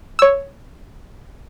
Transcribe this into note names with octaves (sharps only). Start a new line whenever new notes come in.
C#5 E6